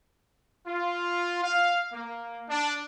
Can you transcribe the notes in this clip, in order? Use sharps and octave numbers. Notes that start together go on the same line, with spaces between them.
F4
F5
A#3
D4